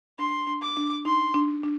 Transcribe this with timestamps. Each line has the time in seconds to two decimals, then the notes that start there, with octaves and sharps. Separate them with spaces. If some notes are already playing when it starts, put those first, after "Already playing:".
0.18 D4 C6
0.47 D4
0.62 D6
0.77 D4
1.05 D#4 C6
1.34 D4
1.64 D4